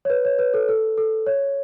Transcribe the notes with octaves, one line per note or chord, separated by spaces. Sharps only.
C#5
B4
C#5
B4
A4
A4
A4
C#5